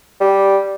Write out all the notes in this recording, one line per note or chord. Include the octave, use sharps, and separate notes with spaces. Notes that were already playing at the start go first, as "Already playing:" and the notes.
G3